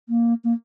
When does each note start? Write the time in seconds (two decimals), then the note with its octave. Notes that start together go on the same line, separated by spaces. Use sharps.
0.09 A#3
0.44 A#3